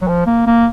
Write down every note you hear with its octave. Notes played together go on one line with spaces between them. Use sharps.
F#3
F3
A#3
A#3